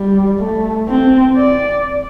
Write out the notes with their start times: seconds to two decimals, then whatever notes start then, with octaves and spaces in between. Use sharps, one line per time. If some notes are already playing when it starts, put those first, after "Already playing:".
Already playing: G3
0.40 A3
0.88 C4
1.37 D5